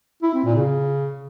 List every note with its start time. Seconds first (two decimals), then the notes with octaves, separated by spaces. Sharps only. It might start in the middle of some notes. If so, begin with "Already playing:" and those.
0.23 E4
0.34 C4
0.45 A#2
0.56 C#3